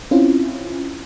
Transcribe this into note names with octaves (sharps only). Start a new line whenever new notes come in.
C4 C#4 E4 F4